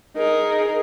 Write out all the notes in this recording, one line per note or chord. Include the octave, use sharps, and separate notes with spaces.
D#4 G#4 A#4